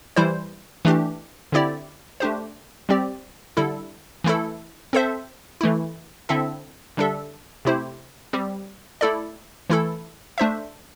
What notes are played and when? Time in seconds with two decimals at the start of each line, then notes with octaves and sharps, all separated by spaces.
0.16 E3 G3 E4 C5
0.85 E3 A3 D4 G4
1.52 D3 C4 E4 G4 D5
2.20 A3 D4 G4 C5
2.89 G3 C4 G4 D5
3.57 D3 G3 E4 A4
4.24 E3 A3 E4 A4
4.93 C4 A4 C5 E5
5.61 E3 A3 E4
6.29 D3 C4 E4 A4 E5
6.97 D3 G3 D4 A4 E5
7.65 C3 A3 E4 G4 C5
8.33 G3 C4 G4
9.01 A3 E4 A4 D5
9.70 E3 A3 E4 A4
10.38 A3 D4 C5 E5